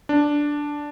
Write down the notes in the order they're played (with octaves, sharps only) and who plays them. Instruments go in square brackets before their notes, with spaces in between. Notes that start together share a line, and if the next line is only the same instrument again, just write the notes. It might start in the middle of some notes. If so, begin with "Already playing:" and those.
[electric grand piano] D4